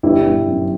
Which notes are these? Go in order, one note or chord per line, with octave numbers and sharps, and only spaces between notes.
G1 E4 G4
G1
F#2